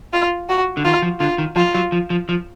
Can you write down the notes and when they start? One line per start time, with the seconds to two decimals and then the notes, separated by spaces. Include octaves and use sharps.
0.13 F4
0.49 F#4
0.77 D3
0.85 D#3 F4
1.02 F3
1.20 D3 F4
1.38 D#3
1.56 F3 F4
1.74 F#3
1.92 F3
2.10 F3
2.29 F3